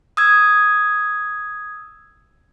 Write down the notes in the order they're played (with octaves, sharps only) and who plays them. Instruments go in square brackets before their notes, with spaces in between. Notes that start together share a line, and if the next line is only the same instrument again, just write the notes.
[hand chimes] D#6 E6 G#6